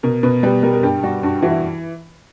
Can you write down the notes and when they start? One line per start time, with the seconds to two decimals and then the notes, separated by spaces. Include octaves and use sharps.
0.03 B2 A#4
0.23 B2 B4
0.43 G3 B4
0.63 G3 A#4
0.73 A#4
0.83 G2 G4
1.03 G3 F#4
1.23 G2 F#4
1.42 E3 F#4
1.51 E4